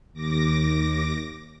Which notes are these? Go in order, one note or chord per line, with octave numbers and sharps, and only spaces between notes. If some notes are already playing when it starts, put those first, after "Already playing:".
D#2 D6 A#6